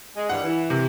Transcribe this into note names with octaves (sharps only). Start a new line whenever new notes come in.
G#3
D3 E3 G3 F#5
E3
C3